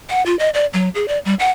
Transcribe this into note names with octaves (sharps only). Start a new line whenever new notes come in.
F#5
F4
D#5
D5
F#3
G#4
D5
G3
F#5